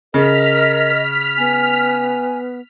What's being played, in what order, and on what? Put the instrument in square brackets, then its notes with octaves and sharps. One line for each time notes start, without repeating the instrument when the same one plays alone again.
[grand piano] C#3 [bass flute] A#4 [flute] D#5 [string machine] F6 B6
[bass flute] B3 [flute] G#5